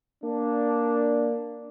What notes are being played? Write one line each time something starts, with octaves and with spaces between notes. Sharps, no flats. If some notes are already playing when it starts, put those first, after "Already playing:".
A#3 D4